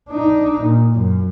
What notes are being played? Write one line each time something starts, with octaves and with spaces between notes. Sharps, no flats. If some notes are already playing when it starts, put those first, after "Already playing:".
D4 D#4
A#2
F#2